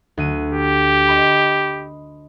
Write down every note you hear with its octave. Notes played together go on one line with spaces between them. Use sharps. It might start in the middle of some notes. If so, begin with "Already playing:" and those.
D2 F#6 D#7
G4
D#5 B5 C6